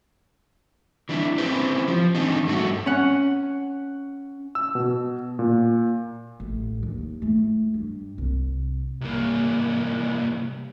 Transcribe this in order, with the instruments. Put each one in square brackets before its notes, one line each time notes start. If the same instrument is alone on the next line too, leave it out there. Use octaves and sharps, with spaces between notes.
[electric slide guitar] E3 G3 D4 E4
C4 C#4 E4 G4 B4 C5
F3
D#3 E3 C4 D4 D#4
G2 A3 D4 F#4
[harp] C#4 F#5
[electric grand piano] E6
B2
A#2
[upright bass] A1
D#2
A3 E4
G2
C2
[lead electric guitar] C2 A#3